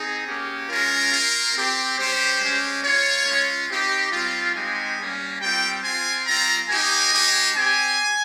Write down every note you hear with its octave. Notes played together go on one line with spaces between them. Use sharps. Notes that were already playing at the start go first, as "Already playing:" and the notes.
Already playing: C4 D#4 G#4
A#3 C#4 G4
G#3 C#4 F4 A#4
A#3 F4
C4 G4
G3 C#4 G4 C5
G#3 C#4 G4
A#3 F4 C#5
G#3 C#4 F4
C4 D#4 G4
G3 C4 F4
G#3 C4 D#4 G4 G#5
G3 A#3 C#4
G3 C4 F4 G5
C4 F4 G#5
G3 C4 F4 A#5
A#3 D#4 G4 G#5
G#3 D#4 G4
C4 G4 G#5